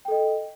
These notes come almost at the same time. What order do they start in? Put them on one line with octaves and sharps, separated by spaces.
G5 A4 D#5